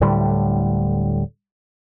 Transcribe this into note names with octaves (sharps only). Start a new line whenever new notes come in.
D1 A2 D3 G3